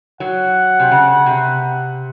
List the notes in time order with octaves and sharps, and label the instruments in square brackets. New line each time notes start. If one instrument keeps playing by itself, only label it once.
[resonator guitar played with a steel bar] F#3 [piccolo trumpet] F#5
[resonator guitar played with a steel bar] C3
C#3
C3